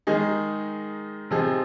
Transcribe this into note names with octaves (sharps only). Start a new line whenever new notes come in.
D#3 G#3 D#4 G#4
C3 F3 C4 D#4 G#4